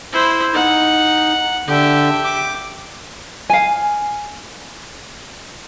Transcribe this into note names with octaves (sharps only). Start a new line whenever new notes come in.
E4 C5
D#4 F#5
D3 G4 E5
D6
F5 G#5